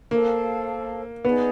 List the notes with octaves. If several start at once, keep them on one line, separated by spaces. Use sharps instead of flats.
A#3 A4 C5 F5 A5
B3 D#4 G#4 B4 D5